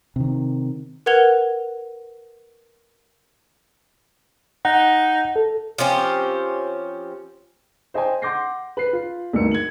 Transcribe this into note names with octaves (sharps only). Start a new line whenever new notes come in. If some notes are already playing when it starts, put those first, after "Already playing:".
C3 D#3
A#4 B4 F#5 G#6 F7 G7
D#4 F#5
A4
F3 C4 C#4 G4
C5 D#5 G5 G#5
F#5 C6 D6 G6 A#6 C7
B4 C7
F4
D2 G2 D#4 A#4 E6 C#7
G#6 F#7